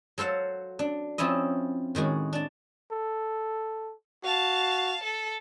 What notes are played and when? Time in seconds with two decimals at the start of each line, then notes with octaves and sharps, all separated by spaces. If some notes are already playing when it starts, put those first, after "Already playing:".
0.18 F#3 A4 C5 F5 F#5
0.79 D4
1.18 F3 C4 C#4 E4 D#5
1.95 A2 D#3 G#3 F#4
2.33 D4 A5
2.91 A4
4.24 F#4 F5 A5
5.03 A4